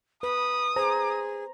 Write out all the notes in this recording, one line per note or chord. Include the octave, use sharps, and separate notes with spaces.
B4 B5 D#6
G#4 C5 A#5